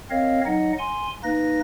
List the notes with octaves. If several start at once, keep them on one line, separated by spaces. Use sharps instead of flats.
C4 A#4 C#5 D#5 F5
F#3 D#4 D#5 F#5
G#5 C6
A#3 D#4 B4 A#6